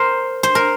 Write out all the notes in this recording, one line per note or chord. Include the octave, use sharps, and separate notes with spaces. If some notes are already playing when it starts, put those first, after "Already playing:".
Already playing: A#4 C5
C5
A#4